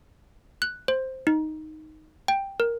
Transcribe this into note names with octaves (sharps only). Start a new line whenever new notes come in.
F#6
C5
D#4
G5
A#4